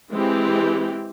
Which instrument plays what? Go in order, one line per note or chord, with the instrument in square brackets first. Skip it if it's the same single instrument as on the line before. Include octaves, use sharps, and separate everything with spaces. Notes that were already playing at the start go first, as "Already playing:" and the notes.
[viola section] E3 G#3 C4 G4